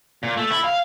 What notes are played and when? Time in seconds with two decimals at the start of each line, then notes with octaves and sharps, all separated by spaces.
0.23 A#2
0.37 A3
0.51 E4
0.64 F5